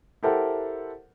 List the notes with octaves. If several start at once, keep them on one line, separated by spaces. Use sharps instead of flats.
E4 G4 A4 A#4 C5 F#5